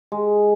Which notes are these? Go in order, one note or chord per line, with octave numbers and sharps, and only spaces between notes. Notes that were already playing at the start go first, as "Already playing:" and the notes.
G#3